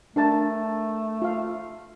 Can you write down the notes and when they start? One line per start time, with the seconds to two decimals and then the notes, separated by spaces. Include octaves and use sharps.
0.16 A3 D4 A#4 A5
1.22 F4 F5